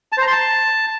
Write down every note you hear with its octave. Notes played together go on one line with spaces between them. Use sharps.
A5
C5
A#5
C6
A5